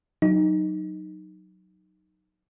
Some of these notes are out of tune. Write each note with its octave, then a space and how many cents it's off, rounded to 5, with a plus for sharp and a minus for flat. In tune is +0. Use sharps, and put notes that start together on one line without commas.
F#3 +0 D#4 -10